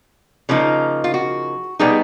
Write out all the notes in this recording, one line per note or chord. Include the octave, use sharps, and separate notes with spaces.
C#3 F3 A#3 D#4
F4
F#4
B2 G3 B3 D#4 G#4